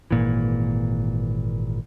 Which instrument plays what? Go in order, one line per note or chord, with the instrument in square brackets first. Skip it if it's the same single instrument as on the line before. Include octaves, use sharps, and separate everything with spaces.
[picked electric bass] G#1 A#2 E3